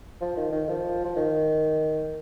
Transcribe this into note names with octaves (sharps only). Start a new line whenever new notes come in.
F3
D#3
D#3
F3
F3
D#3